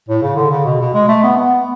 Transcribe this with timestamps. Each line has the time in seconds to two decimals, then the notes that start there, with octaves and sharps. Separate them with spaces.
0.08 A2
0.22 C#3
0.37 D3
0.51 C#3
0.65 B2
0.80 B2
0.94 G#3
1.08 A3
1.23 B3
1.37 B3